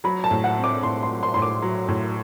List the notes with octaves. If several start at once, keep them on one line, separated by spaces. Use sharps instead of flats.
F#3 B5
A5
A2
F#5
C4
D6
A2 C6
C6
F#3
C6
A2 C6
D6
F#3
A2